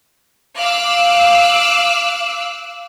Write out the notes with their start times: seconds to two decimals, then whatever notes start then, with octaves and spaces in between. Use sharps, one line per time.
0.58 F5 D6 E6 F#6